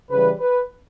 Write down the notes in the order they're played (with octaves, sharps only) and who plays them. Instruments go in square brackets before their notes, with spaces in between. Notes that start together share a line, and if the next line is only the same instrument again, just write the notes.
[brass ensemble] C#3 E3 G3 B4
B4